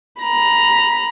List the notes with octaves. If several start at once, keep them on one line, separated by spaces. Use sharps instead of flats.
A#5 B5